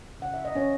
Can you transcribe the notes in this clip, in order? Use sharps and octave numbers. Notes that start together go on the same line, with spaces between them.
C#3 F#5
E5
D#5
E3 C#4 C#5